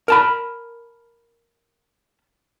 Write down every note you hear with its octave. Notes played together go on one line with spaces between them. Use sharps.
A#4 A5 B5